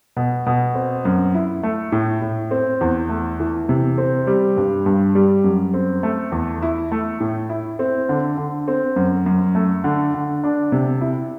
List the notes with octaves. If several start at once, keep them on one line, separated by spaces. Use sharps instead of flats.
B2
B2
C4
F#2
E4
A3
A2
A2
C4
E2
A3
E3
C3
C4
G3
G2
G2
G3
F#2
C4
A3
E2
E4
A3
A2
E4
C4
D3
D3
C4
F#2
F#2
A3
D3
D3
D4
C3
E4